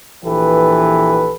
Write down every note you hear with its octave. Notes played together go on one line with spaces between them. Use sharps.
A#1 E3 G4 A4 B4